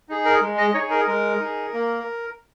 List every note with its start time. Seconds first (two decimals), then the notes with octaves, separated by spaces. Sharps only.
0.09 D#4 G#4
0.25 A#4
0.41 G#3
0.58 D#5
0.74 D#4 G#4 C#5
0.91 A#4
1.07 G#3 A#4
1.40 D#4 G#4
1.74 A#3